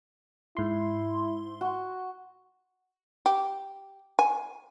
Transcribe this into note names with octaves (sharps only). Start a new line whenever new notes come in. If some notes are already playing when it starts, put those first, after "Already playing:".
G#2 E4 C6
F#4
G4
G#5